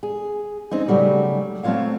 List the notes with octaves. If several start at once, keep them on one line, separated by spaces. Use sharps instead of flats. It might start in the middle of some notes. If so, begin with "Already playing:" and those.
G#4
C4 C#4 D#4
C#3 E3 F#3 G3 A3
F#3 A3 C4 F4 C#5 F5